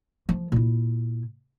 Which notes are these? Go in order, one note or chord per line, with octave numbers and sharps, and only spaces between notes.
F3
A#2 E4